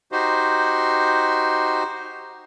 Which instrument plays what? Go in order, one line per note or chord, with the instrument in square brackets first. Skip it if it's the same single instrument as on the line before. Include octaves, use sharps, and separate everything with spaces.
[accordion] D#4 F#4 G4 C5